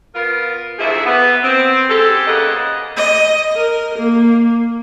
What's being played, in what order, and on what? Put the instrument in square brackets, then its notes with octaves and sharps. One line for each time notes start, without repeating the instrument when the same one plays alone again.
[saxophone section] B3 F4 A#4
D2 G#2 F3 E4 G#4 E5
B3
C4
G#3 C#4 G4 A4
F#2 C#3 A#3 B3 D#5 F#5
[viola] D#5
A#4
A#3